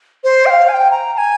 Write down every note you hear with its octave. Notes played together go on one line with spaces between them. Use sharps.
C5
G5
F5
G#5
G5
A#5
A#5
G#5